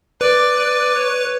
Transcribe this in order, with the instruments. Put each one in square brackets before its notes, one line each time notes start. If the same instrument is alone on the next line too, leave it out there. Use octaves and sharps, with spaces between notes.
[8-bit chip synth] B4 [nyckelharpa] D5
[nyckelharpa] D5
C#5